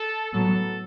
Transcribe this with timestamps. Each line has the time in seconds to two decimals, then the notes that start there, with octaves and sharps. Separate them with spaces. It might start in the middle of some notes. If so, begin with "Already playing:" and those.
Already playing: A4
0.33 A2 F#3 B3 A4